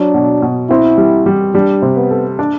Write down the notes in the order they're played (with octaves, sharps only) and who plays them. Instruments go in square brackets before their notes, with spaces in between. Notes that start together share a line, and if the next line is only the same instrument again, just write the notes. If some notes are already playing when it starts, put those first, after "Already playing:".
Already playing: [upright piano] F#3 [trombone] D4
[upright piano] B2
B2
[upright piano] C4 [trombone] E4
[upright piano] G3
G3
[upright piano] G3 [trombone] D4
[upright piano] C3
[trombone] B3
[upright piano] A4
D4